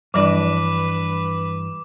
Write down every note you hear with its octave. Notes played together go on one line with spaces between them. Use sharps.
G2 E3 F3 G3 D4 B4 D5 D6